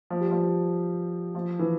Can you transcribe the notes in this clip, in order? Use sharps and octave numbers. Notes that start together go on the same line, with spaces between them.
F3
G3
F3
F3
E3